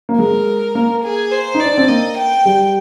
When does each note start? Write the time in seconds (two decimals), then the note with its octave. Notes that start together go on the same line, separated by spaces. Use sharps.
0.09 A#3
0.18 G#3 A#4
0.75 A#3
1.04 G#4
1.32 C5
1.55 D#4
1.60 D5
1.66 D4
1.78 C4
1.88 A#3 D#5
2.18 G5
2.45 G3